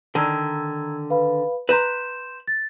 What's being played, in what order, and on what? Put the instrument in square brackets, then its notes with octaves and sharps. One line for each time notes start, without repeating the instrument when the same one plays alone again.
[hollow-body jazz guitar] D3 D#3 [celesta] A#5 E6 G#6
[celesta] B4 F5 B5
[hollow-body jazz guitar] B4 A#5 [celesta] C6 G6 E7
[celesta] A6